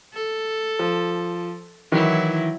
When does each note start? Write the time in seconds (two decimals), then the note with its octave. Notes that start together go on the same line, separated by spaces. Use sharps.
0.14 A4
0.79 F3
1.92 D#3 E3 F#3 E4